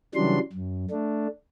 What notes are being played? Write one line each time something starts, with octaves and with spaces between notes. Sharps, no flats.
C#3 E3 F#3 G3 D4 C6
F#2
A3 D4